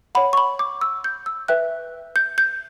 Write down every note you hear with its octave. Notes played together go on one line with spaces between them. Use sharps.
C#5 F#5 B5
C#6
B5
D6
E6
G6
E6
B4 E5 G5 F#6
G6
G6